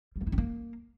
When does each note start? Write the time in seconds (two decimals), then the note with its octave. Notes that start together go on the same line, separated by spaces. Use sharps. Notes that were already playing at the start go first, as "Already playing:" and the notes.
0.16 G3
0.21 A#3
0.27 E4
0.32 C4
0.38 A#3